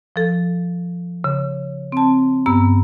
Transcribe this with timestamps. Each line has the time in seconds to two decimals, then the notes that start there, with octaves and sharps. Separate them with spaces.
0.16 F3 A4
1.24 C#3
1.92 C4 A5
2.46 G2 B3 A#5 E6